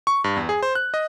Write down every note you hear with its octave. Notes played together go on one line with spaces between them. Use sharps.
C#6
G2
E2
G#4
C5
F#6
D#5